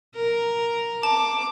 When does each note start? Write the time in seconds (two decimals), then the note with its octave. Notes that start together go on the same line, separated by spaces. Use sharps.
0.16 A#4
1.03 A5 D6